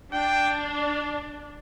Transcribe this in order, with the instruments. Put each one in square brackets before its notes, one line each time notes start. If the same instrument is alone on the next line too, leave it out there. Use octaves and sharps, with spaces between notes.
[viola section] D4 [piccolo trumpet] G5